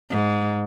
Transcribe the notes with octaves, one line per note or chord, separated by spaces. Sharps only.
G#2